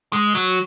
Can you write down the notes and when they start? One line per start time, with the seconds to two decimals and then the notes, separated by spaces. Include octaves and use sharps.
0.13 G#3
0.35 F#3